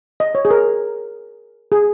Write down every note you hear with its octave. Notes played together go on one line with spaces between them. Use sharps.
D#5
C#5
G#4
A#4
G#4